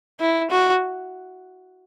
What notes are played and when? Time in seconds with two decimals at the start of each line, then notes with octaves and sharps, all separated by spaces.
0.20 E4
0.50 F#4